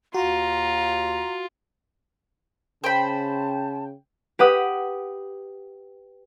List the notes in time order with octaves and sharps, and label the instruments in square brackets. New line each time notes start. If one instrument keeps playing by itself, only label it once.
[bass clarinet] D#2 [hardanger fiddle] F4 [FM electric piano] F#4 [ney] A#5
[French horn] C#3 [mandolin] C5 B5 [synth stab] G5 [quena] A5
[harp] G4 B4 F#5 D#6